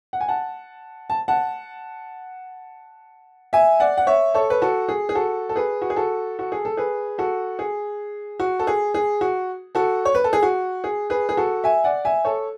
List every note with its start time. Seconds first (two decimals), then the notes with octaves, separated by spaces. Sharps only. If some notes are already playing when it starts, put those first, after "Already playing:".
0.13 F#5
0.20 G#5
0.28 F#5 A5
1.10 A5
1.28 F#5 A5
3.53 E5 G#5
3.80 D5 F#5
3.98 F#5
4.07 C#5 E5
4.34 A4 C#5
4.50 B4
4.62 F#4 A4
4.88 G#4
5.09 G#4
5.15 F#4 A4
5.49 A4
5.56 G#4 B4
5.82 F#4
5.90 G#4
5.96 F#4 A4
6.39 F#4
6.52 G#4
6.65 A4
6.77 G#4 B4
7.18 F#4 A4
7.59 G#4
8.39 F#4
8.59 A4
8.67 G#4
8.94 G#4
9.21 F#4
9.75 F#4 A4
10.05 C#5
10.15 B4
10.24 A4
10.33 G#4
10.43 F#4
10.84 G#4
11.10 G#4 B4
11.29 G#4
11.37 F#4 A4
11.64 E5 G#5
11.84 D5 F#5
12.05 E5 G#5
12.25 A4 C#5